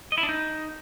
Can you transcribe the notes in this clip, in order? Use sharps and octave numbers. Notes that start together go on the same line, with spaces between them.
D#5
E4
D4
D#4